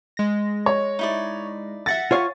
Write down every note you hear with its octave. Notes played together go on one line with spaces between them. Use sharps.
G#3 A#6
C#5
D#4 E4 D5
E5 F#5 A6 A#6
F4 C#5 F5 G#5 C#6